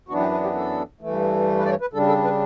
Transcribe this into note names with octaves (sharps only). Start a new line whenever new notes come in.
F#2 E3 B3 D4 F#4
G4
B4
G4
A4
G2 E3 A3
B4
D5
C#5
B4
C#3 G3 D4 A4
A4
B4